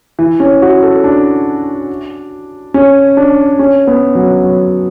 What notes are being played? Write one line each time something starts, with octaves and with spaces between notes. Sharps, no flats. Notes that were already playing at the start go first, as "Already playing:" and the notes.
E3
C#4
F#4
A4
D4
C#4
D4
C#4
B3
F#3
F#3